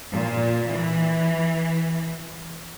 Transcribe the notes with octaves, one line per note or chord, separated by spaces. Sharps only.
A#2
E3